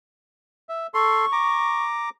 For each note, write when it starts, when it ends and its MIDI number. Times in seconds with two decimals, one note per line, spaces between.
0.69 0.87 76
0.94 1.26 69
0.94 1.26 84
0.94 1.84 85
1.32 2.09 82
1.32 2.09 86